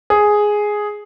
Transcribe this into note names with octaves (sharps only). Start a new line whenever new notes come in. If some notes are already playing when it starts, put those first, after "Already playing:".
G#4